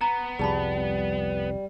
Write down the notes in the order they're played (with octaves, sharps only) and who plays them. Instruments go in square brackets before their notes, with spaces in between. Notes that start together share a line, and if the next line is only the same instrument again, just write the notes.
[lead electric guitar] B3 [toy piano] A#5
[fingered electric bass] C2 F2 [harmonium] G3 [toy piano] G#4 A5 B5